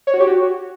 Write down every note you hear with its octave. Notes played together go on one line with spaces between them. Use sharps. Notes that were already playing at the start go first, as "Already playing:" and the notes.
C#5
F#4
G4
F#4